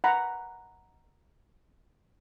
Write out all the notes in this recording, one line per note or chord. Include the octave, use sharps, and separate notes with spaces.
F#5 A#5 B5